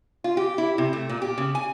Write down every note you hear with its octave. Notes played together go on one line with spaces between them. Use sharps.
F4
G4
E4
C3
A3
A#2
G4
C#3
G#5